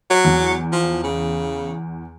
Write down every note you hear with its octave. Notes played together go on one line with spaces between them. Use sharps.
F#3
E2
F3
C#3